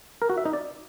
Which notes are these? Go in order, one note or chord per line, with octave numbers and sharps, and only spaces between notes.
A#4
F#4
E5
D#4
D5